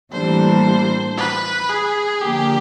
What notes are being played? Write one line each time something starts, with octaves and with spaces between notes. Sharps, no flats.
A2 E3 G3 A#3 D4 C5
B4
G#4
D3 F3 A#3 G4